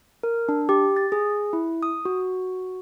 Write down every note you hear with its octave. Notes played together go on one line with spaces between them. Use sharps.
A#4
D4
G4
A6
G#4
E4
D#6
F#4